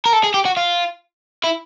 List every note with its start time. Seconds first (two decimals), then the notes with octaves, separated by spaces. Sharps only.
0.05 A#4
0.13 A4
0.24 G#4
0.34 G4
0.45 F#4
0.57 F4
1.44 E4